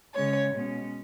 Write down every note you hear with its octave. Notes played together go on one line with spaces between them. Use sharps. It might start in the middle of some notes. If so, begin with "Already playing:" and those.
C#3 G#3 C#4 C#5
B2 G#3 C#4